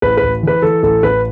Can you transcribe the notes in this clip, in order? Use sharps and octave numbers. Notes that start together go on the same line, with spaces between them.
A1 B4
B4
A1
E3 B4
E3 A4
A1 A4
A1 B4